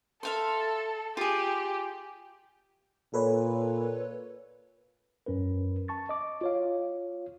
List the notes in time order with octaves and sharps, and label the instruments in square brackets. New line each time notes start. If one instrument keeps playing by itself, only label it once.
[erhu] A4 [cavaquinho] E5 F5 C6
[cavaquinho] F4 G#4 [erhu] G4
[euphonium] A#2 [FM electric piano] A4 B4 C#5
[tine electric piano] F#2 C#4 A#4 B4
A5 C#6 A6
D#5 D6
F4 C#5 F5